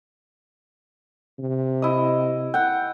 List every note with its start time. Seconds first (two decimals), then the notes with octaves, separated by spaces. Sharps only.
1.39 C3
1.82 E4 D#5
2.54 F#5 G5